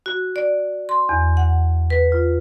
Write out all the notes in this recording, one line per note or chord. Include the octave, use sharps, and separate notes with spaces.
F#4
D5
C6
E2
F#5
B4
F4